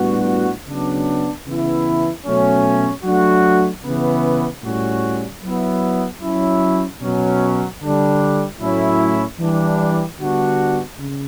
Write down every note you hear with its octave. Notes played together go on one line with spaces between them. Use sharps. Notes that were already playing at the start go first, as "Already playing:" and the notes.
Already playing: A2 G3 B3 D4 F#4
C#3 F#3 B3 D4
C#3 E3 B3 E4
B2 F#3 A3 C#4
F#3 A3 D4 F#4
C#3 E3 B3
A2 G3 C#4 F#4
F#3 B3 E4
F#3 C#4 E4
B2 F#3 C#4
D3 G3 D4
A2 F#3 A3 C#4 E4
E3 G3 D4
D3 G3 B3 D4 F#4
C#3